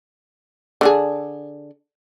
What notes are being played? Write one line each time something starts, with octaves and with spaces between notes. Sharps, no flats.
D3 D4 G#4